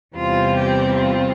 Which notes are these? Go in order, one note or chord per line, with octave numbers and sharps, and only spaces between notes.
E2 C3 G3 C4 F4
G4
F4